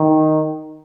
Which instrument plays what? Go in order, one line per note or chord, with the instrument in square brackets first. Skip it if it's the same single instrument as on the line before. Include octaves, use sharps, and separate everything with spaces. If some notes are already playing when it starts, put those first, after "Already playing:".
Already playing: [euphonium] D#3